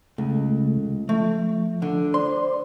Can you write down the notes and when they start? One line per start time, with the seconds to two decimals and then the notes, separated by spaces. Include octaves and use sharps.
0.18 C#2 C#3 A3
1.09 F3 A3
1.82 D3
2.14 C5 D5 C6